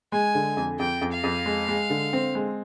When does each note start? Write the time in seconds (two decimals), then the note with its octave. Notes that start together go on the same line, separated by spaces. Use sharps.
0.12 G#3 G#5
0.35 D3
0.57 F2
0.79 F2 G5
1.01 F2
1.12 F5
1.24 F2
1.46 G#3
1.68 G#3
1.90 D3
2.13 C4
2.35 G#3